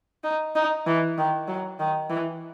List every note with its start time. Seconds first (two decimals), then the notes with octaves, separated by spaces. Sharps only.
0.24 D#4
0.55 D#4
0.86 E3
1.18 D#3
1.48 F#3
1.80 D#3
2.10 E3